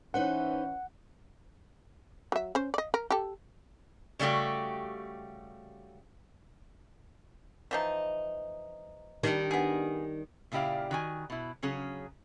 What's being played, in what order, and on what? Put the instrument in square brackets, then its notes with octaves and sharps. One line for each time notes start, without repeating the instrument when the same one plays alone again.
[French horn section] E3 C#4 [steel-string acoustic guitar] D#4 B4 C5 [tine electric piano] F#5
[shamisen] F#3 E5
C#4 C5
D5 D#5
A#4
G4 A4
[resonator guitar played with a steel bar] C#3 G3 A3 F#4 G4
[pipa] E3 F3 D#4
[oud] D#3 G3 D4
[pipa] B3 G#4
[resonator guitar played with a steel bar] A#2 C#3 E4 G4 D5 F5
D#3 F#4 G#5
B2 E4
C#3 F#3 C#4 G#4